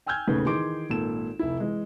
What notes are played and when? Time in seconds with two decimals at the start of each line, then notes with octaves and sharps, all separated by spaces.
0.06 G5 G#5 E6 F6 G6 G#6
0.28 E1 D#2 A2 C#3 G#4 B4
0.46 D#3 E3 G#4 C6 D6 D7
0.90 G#1 A#2 A4 E7
1.39 F1 E4
1.60 E3 G#3